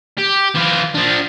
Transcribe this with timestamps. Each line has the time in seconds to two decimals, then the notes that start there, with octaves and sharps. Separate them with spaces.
0.18 G4
0.55 E3 F4
0.95 F3 D4